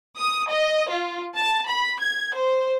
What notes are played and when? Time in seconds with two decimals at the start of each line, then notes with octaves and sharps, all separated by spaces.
0.17 D#6
0.49 D#5
0.90 F4
1.36 A5
1.67 B5
2.00 G#6
2.35 C5